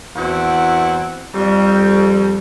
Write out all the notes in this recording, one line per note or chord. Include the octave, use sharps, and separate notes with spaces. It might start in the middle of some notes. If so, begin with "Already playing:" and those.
E2 C4 E4 F#4 F#5
F2 G3